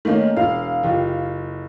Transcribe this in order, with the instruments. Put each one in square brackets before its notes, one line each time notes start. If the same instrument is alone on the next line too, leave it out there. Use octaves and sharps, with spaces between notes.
[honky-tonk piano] D#3 [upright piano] A3 A#3 C#4
[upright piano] E1 [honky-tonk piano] F5
[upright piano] F#1 F4 G4